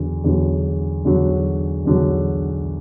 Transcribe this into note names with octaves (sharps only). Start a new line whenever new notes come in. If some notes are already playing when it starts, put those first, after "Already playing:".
Already playing: E2 D3 F#3
E2 D3 F#3
E2 D3 F#3
E2 D3 F#3